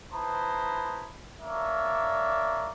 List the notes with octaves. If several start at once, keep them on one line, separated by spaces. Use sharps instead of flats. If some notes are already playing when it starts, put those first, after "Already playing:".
E4 B4 C5 A5 A#5 D#6
A#3 D4 A#4 C#5 D5 E5